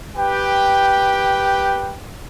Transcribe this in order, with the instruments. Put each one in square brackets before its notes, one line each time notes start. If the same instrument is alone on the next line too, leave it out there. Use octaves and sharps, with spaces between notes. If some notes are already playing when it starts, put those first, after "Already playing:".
[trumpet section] G4 B4 G5